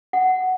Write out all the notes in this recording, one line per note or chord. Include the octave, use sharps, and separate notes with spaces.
F#5